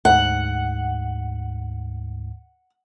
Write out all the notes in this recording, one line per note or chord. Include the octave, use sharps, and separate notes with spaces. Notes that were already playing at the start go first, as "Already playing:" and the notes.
D2 G#2 F#5